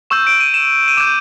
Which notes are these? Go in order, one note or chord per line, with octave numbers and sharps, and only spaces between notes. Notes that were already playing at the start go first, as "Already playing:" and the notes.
C#6 E6 G6 E7
D7
D#7
E7
D#7
D6 G6 E7